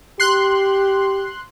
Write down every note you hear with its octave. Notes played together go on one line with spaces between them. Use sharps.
G4 C6 F#6